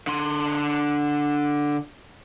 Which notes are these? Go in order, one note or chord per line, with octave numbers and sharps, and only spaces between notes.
D3 C6